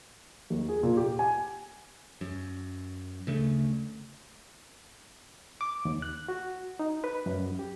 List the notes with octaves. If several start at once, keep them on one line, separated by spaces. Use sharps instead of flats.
D#2
G#4
A#2
G4
G#5
F#2
D2 C#3 A3
D6
D#2
F#6
F#4
D#4
B4
F#2
G4